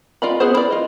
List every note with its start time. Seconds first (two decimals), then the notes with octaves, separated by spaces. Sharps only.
0.22 F4 A#4 D5 D#5 B5
0.40 B3 G#4 C5
0.54 E4 A#4 D5
0.71 F4 D#5